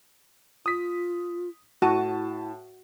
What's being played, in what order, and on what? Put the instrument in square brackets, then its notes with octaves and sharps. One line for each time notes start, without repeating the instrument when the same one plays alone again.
[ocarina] F4 [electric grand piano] D#6 B6
[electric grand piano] A2 A5 D#7 [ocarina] E4 [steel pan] F#4